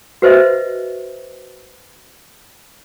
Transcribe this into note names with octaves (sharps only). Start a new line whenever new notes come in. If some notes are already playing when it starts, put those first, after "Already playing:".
F#4 B4 C5 D#5 E5